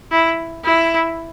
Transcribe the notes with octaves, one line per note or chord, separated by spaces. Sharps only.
E4
E4